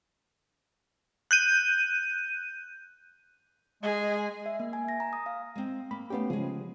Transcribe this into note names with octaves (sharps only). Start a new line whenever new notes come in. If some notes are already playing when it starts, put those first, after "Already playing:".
F#6 G6 D#7
G#3 G#4 D#5
E5
A#3
G#5
A#6
A#5
D#6
F5
G#3 C4
A#3 B5
A3 B3 C#4 G4 F5 G5
C#3 F3 G#3 G#4